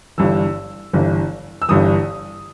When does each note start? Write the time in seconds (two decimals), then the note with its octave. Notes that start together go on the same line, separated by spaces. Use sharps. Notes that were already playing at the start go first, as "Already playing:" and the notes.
0.18 G1 G2 E3 E6
0.93 G1 G2 E3
1.62 E6
1.68 G1 G2 E3 D#6